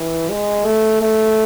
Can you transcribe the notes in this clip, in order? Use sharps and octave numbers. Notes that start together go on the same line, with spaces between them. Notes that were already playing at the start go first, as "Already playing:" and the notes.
Already playing: E3
G#3
A3
A3